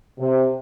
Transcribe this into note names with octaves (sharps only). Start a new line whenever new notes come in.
C3